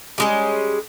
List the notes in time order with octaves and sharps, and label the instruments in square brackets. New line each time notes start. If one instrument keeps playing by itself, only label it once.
[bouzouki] G3 G#3 C#4